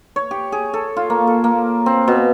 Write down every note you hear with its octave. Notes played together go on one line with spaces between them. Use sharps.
C#5
G4
G#4
A4
F4
A#3
A4
A#3
C4
B2